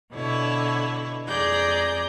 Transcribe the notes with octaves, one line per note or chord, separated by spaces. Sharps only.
B2 D3 E4 C#5
F2 G#4 D5 A#5 G6